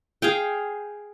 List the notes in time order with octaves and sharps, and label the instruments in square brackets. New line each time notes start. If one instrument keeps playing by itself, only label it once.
[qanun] G#4 F5 G5